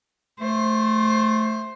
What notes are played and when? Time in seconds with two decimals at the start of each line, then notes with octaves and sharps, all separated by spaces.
0.40 A3 C5